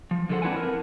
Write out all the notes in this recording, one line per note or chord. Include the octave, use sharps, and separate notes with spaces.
F3
D3 F3 G#3 A4 C5 F#5
C4 D4 E4 B4 F#5 G#5
A#4